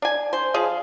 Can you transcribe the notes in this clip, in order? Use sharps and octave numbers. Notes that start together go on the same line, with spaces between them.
D4 G#5
C5
F3 G#4 F5